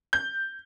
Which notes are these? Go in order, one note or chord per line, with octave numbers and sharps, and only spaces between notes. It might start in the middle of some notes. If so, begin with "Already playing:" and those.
G6